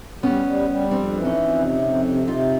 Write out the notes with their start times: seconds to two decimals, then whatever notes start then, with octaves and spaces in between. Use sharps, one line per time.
0.23 G3 B3 C#4
0.45 G3
0.69 G3
0.91 F2 C4 D4
1.14 E3
1.25 C#4 D#4
1.36 F2
1.59 C3
1.81 F2
2.05 C3
2.27 C3 D#4 F4